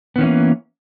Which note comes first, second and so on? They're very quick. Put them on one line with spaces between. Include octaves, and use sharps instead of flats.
B3 D#3 C#4 E3 A#3